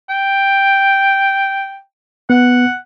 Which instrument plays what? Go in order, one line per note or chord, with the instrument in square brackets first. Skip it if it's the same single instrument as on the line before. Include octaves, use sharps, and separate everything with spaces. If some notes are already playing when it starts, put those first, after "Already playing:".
[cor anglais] G5
[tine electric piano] B3 [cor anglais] F#5